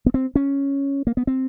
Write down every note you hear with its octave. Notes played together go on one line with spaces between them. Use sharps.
B3
C4
C#4
A#3
B3
C4